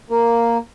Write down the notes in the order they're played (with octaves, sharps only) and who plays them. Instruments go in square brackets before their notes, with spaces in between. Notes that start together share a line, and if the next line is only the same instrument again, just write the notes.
[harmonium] A#3